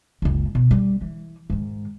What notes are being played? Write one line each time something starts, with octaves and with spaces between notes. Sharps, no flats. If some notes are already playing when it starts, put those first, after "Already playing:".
F#1 C#2
B2
G3
E3
G#2 D#3